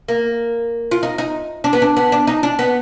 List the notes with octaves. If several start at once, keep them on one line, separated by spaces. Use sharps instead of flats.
A#3
F4
D#4
D#4
D4
B3
D4
B3
D4
D#4
D4
B3